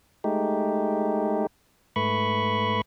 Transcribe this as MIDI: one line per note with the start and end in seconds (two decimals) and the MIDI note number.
0.24 1.47 56
0.24 1.47 57
0.24 1.47 63
0.24 1.47 67
1.96 2.81 44
1.96 2.81 57
1.96 2.81 71
1.96 2.81 83
1.96 2.81 85